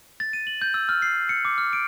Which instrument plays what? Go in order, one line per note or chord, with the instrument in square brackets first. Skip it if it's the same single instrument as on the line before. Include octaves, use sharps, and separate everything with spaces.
[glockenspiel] A6
D#7
F#7
G6
E6
F6
C7
C#7
D6
F6
D7